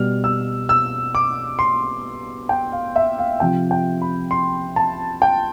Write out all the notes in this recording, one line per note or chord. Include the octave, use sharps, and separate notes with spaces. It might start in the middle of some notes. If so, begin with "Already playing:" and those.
Already playing: B2 G3 F6
E6
E6
D6
C6
G5
F5
E5
F5
C3 F3 G5
G5
B5
C6
A5
G5